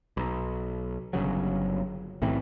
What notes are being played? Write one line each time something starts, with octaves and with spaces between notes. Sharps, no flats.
B1
G1 D#2 C#3 F#3
B1 A2 E3 C4